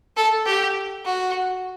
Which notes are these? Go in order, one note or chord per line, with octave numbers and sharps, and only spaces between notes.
A4
G4
F#4